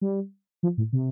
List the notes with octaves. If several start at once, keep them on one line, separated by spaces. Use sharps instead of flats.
G3
F3
A2
C3